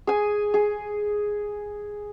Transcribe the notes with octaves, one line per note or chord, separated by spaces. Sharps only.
G#4 G#5
G#4